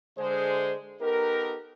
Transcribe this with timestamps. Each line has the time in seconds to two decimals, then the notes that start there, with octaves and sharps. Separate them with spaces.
0.18 D3 G#3 G#4 C5
1.01 B3 D#4 G4 A4 A#4